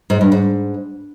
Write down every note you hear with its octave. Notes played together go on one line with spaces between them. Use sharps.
G#2
G2
G#2